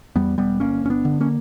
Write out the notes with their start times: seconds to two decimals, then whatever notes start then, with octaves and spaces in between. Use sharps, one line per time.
0.16 E2 G3 B3
0.38 E1 G3 B3
0.60 G1 A#3 C#4
0.84 G1 C#4
0.90 B3 D4
1.05 D3
1.20 A#3 C#4